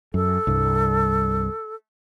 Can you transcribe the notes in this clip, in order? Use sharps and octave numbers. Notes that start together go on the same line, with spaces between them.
F#2 A4
C2 G2